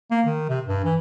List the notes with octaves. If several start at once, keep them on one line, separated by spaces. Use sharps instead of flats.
A#3
D#3
C3
G2
E3